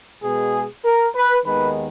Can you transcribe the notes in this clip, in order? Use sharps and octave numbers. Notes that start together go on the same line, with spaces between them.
B2 G#3 B3 G#4
A#4
B4
D#2 D#3 G#3 B3 B4